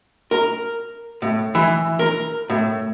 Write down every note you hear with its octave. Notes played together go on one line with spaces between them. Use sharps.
A#4
A2
E3
A#4
A2